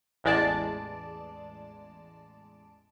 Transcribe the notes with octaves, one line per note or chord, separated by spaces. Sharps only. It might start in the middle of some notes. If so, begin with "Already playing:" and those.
A1 E2 G#3 D5 A5